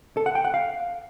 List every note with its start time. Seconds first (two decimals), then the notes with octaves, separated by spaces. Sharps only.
0.17 A4
0.26 F#5
0.35 G5
0.45 F#5
0.54 F5